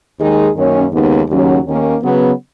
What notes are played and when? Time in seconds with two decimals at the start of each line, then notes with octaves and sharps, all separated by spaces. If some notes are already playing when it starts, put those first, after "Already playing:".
0.19 D#2 D#3 G#3 D#4 G#4
0.56 F#2 D#3 A#3 C#4
0.92 D#2 C#3 G#3 B3 D#4
1.29 D#2 C#3 F#3 C#4
1.65 D#2 D#3 A#3 C#4
2.02 C#3 F#3 B3